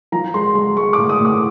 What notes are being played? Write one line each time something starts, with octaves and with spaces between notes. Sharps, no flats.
F3 A#5
G#3 C6
G#3 C6
G#3 C#6
D6
A2
D#6
A2
D6